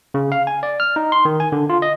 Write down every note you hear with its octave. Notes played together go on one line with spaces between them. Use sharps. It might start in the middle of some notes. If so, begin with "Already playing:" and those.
C#3
F5
G#5
D5
F6
D#4
C6
D#3
G#5
D3
F4
D#5